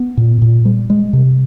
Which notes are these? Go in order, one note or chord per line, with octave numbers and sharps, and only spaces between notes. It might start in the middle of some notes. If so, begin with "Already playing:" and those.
Already playing: B3
A#2
A#2
G3
G#3
C3